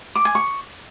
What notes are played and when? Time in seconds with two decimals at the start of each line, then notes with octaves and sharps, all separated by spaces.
0.16 D6
0.25 G#5
0.35 C#6